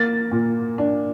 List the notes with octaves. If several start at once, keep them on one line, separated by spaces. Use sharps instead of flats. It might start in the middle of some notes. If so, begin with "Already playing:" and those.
Already playing: A#3 A6
A#2
D4